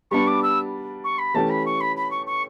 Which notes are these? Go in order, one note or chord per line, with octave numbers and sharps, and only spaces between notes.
G3 B3 D4 C#6
D6
E6
C#6
B5
E3 A3 C#4 G4 A5
B5
C#6
B5
B5
C#6
C#6